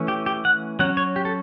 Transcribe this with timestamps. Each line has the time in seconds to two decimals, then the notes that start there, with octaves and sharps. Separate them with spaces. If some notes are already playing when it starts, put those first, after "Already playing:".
Already playing: E3 A3 C#4
0.08 G4
0.26 G4
0.45 F#5
0.79 F#3 C#4 F#5
0.97 C#5
1.16 G4
1.25 A4